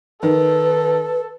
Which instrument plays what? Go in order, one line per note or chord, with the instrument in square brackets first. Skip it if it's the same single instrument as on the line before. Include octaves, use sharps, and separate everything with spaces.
[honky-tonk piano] D#3 [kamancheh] A4 [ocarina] B4